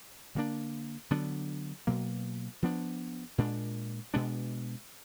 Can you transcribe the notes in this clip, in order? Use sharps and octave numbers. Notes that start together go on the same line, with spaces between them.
D3 F#3 A#3 D4
D3 F#3 B3 D4
B2 F#3 A#3
F3 B3 D4
A#2 G#3 D4
B2 G#3 B3 D4